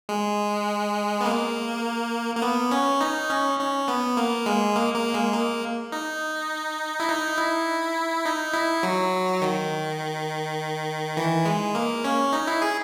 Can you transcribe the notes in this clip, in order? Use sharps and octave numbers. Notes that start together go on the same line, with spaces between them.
G#3
B3
A#3
A#3
B3
C#4
D#4
C#4
C#4
B3
A#3
G#3
A#3
A#3
G#3
A#3
D#4
E4
D#4
E4
D#4
E4
F#3
D#3
E3
G#3
A#3
C#4
D#4
E4
G#4